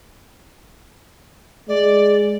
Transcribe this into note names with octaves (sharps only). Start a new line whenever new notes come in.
G#3 D5